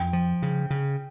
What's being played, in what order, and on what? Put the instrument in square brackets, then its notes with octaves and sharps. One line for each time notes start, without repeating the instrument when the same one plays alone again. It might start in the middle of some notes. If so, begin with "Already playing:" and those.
Already playing: [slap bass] F2 [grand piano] G5
[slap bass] F3
C#3
C#3